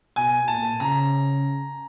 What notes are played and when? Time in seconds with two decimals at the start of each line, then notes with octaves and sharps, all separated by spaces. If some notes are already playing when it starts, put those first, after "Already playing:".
0.16 B2 G#5
0.48 A#2 A5
0.80 C#3 A#5